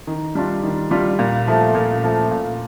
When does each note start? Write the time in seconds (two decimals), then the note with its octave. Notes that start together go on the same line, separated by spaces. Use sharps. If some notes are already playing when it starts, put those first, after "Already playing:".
0.07 D#3
0.35 G3 D4 F4
0.63 D#3
0.91 G3 D4 F4
1.19 A#2
1.47 F3 A3
1.75 A#2
2.03 F3 A3
2.31 A#2